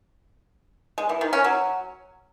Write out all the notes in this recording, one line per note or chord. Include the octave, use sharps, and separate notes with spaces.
G#3
E3
D#3
C#4
F#3